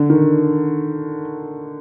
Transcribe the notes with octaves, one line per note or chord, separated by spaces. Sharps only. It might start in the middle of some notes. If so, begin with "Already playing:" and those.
Already playing: D3
D#3